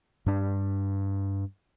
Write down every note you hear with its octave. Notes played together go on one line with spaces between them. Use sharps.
G2 D4